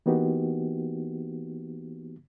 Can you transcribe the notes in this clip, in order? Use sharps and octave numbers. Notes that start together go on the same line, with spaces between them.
E3 A#3 B3 D#4 F#4 G4